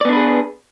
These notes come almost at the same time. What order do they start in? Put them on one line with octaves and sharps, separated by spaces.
D5 B3 D4 B4 G#4